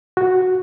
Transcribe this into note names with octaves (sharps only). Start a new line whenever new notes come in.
F#4